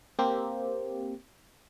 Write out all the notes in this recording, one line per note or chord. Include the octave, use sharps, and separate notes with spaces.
A#3 C4 G4